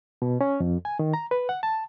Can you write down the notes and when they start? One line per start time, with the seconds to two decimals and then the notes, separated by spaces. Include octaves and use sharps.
0.22 B2
0.41 C#4
0.60 F2
0.85 G#5
0.99 D#3
1.14 A#5
1.31 B4
1.49 F#5
1.63 A5